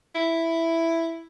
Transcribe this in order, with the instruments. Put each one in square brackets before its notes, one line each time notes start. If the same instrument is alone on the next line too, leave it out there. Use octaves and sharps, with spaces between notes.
[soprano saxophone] E4